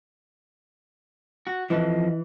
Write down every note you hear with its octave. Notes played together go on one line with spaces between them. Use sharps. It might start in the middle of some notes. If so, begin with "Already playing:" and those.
F#4
F2 E3 F3 D#5